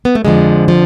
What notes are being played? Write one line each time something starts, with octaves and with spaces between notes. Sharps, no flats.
B3
A3
F2 D3 F3 G#3
F3